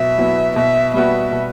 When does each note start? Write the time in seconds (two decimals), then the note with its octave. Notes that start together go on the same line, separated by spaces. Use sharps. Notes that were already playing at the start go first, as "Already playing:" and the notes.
Already playing: B2 F#3 E5
0.18 F#3 B3 E4
0.56 B2 E5
0.94 G3 B3 F#4 E5
1.32 B2